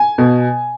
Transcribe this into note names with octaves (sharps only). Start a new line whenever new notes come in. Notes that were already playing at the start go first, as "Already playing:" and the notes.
Already playing: G#5
B2